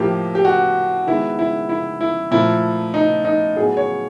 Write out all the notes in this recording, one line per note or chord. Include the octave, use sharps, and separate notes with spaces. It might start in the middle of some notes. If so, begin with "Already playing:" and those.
Already playing: A2 F3 A#3 G4
G4
F#4
D#3 G#3 B3 E4
E4
E4
E4
A#2 F3 A3 E4
D#4
D#4
A2 F#3 B3 G#4
C#5